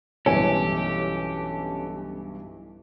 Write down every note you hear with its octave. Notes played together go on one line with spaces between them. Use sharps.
B1 G2 E3 C#4 G4 A4 C#5 G#5